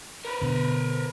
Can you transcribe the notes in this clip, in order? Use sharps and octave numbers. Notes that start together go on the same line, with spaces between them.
A#4 B4
B2 D3